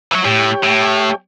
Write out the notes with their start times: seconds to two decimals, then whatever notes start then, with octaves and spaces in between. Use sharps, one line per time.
0.12 E3 F#3 E5
0.25 A2 G4 C#5 G5
0.63 A2